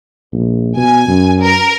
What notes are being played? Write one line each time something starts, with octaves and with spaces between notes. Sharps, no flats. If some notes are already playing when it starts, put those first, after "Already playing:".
A#1
B2 G#5
F#2
A#4